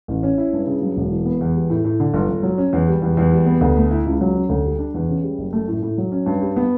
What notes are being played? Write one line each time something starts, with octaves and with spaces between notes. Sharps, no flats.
A1
C#4
E4
G2
C#3
F#3
E1
E3
B3
E2
G3
A2
A2
D3
G1
G1
F#3
C#4
E2
G3
E2
E2
G3
B3
D2
A3
E4
C#2
F#3
C#4
D2
G3
D4
E2
C#3
G3
F#1
A3
A2
A2
F#3
C#4
G2
G3
B3